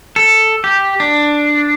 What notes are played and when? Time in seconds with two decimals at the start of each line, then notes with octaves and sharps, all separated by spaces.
0.16 A4
0.64 G4
1.00 D4